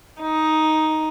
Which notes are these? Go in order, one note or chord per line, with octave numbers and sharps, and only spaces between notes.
D#4